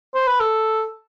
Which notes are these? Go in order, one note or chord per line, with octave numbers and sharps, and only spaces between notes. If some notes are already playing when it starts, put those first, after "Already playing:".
C5
B4
A4